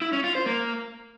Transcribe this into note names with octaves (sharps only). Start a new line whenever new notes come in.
E4
C#4
F4
C5
A#3